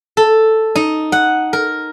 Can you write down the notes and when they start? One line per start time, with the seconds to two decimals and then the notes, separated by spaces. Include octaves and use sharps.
0.17 A4
0.76 D#4
1.12 F#5
1.53 A#4